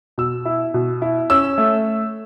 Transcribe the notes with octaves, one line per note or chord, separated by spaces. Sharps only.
B2 E6
E4
B2
E4
C#4 E6
A3